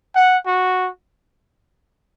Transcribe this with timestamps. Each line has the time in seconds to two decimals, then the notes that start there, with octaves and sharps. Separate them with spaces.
0.16 F#5
0.46 F#4